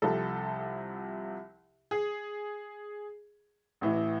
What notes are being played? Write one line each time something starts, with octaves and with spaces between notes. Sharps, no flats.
C2 C3 F3 A4
G#4
A1 A2 E3